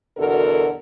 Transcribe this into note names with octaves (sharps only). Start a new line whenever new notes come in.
E2 B2 D3 F#4 A4 A#4